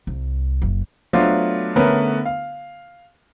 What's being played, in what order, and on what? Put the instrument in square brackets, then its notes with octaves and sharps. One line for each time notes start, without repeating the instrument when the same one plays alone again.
[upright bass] C2
F#1
[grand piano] F#3 A3 B3 D4 F4 C5
D3 A3 B3 C#4 A#4 B4
F5